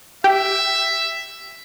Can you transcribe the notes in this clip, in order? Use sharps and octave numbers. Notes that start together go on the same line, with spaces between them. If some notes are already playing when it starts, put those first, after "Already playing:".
G4 E5